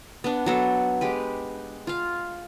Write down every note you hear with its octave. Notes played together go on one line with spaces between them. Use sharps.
B3 D4
F#3 B3 A4
G#3 G4 B4
F4 F5